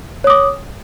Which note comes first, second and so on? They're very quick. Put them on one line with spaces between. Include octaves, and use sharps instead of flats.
C#5 D#6 D6